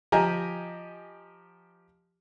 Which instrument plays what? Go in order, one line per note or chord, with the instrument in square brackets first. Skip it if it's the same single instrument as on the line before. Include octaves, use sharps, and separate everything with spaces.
[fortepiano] F3 G4 D#5 G#5 A#5